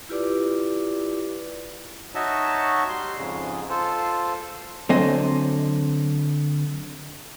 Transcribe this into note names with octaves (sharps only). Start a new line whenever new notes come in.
E4 F4 G4 B4 D5 D6
D#4 F#4 C#5 D#5 E5 A5
G3 C6
F2 G#2 C#3 G#3
F4 A4 C5
D3 F#3 C4 C5 D#5 G#5